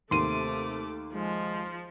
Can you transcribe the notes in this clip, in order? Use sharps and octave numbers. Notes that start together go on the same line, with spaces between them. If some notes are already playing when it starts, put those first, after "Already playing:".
D#2 C3 A3 C6 D6 D#7
F3 G#3